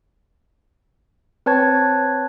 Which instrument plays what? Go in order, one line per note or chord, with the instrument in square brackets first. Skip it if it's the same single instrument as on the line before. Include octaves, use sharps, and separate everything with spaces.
[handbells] C4 B4 C#5 A5 G#6